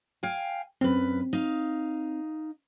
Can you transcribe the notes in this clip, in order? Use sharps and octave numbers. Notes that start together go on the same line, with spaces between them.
F5 G5 G#5
F#2 C4 B4
D#4 F5